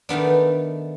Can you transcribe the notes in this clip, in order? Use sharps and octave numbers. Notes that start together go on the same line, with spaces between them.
D#3 A3 B3 D4